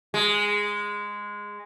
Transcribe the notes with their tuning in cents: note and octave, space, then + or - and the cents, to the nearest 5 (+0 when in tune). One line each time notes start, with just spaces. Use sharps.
G#3 -10